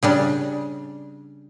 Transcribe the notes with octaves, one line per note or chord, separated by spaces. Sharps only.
C#3 G3 D4